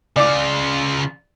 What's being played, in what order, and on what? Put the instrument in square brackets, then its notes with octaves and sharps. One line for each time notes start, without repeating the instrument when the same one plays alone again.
[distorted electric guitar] C#3 F4 [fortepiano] D5 D6